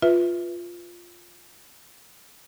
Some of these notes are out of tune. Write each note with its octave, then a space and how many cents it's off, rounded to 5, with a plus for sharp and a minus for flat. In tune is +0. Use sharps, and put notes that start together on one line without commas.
F4 +0 B4 +0 E5 +0